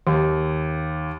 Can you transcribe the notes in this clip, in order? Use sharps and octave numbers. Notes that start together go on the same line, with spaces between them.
D#2